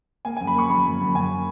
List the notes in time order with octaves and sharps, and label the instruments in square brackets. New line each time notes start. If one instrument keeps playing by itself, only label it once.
[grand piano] A#3 G#5
F#2 G#5
B5
A#3 C#6
F#2 B5
F#2
F#2
F#2 G#5